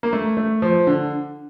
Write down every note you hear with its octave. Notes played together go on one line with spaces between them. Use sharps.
A#3
A3
A3
F3
D3